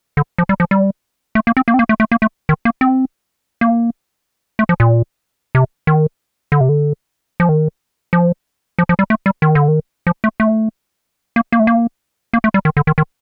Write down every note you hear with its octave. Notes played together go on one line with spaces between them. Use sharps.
D3
F3
G3
F3
G3
A3
A#3
C4
A#3
C4
A#3
A3
A3
A#3
A3
D#3
A#3
C4
A#3
A3
F3
A#2
C3
D#3
D3
C3
D3
F3
D#3
F3
F3
F3
G3
A3
G3
D#3
D3
D#3
F3
A3
A3
A#3
A#3
A3
A#3
A#3
A3
G3
D#3
D3
D#3
D#3